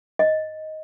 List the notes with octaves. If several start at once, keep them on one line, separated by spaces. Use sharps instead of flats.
D#5